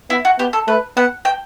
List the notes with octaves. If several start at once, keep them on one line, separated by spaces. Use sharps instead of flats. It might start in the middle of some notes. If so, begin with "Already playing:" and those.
B3 E4
F#4
B3 G4
A4
A3 B4
B3 F#5
G5